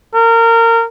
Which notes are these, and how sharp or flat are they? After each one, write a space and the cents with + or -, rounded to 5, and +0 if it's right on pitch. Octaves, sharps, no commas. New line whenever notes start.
A#4 -25